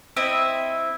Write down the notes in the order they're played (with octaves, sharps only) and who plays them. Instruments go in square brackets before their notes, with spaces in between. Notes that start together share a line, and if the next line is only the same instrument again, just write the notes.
[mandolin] C4 E4 D#5 E5